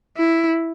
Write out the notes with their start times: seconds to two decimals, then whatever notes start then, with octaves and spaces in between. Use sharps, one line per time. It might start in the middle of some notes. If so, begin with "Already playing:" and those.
0.18 E4